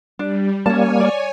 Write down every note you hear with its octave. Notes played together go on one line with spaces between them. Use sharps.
G3 D4
G3 A#3 C#4 C#5 G#5 A5
D5